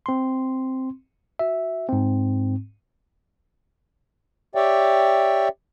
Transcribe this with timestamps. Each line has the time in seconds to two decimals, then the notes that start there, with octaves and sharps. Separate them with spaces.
0.06 C4 C6
1.39 F#4 E5
1.89 G#2 C4
4.55 G4 C#5 D5 E5 G5